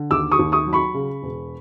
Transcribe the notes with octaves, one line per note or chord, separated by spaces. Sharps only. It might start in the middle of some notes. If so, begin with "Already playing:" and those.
Already playing: D3
D#2 D6 E6
C#6 D#6
D#2
C#6 D#6
F#3
B5 C#6
C#3
E1